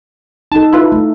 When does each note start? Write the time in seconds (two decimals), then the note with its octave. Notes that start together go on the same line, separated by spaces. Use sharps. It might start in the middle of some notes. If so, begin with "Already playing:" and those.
0.52 D#4 A4 A5
0.72 E4 F4 B4
0.92 A3